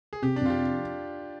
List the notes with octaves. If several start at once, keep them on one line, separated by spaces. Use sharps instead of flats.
G#4
C3 G4
D4
F2 F4
G4